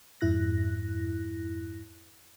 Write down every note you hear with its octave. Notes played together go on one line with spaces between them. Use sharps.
F2 G#2 E4 F#6 A#6